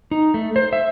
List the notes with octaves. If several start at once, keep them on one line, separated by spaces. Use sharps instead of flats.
D#4
A3
C5
E5